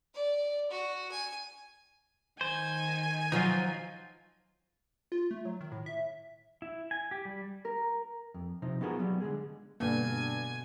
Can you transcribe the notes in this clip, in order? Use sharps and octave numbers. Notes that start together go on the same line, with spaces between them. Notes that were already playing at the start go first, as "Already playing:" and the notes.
D5
F#4
G#5
D#3 C5 G#5
F3 F#3 D#4 F4
F4
A3
F#3
D#3
A2
E5
E4
G#5
G4
G3
A#4
F2
C3 F3 D#4
B3 D#4 F4 F#4 G#4 A#4
F#3 G3 B3
D3 G#3 G#4
G2 B2 D3 A#3 G#5